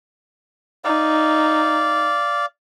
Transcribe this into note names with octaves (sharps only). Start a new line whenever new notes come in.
D#4 D5 F5